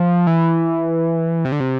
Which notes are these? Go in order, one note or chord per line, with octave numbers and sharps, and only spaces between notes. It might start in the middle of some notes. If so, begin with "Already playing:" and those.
Already playing: F3
E3
C3
D3
C3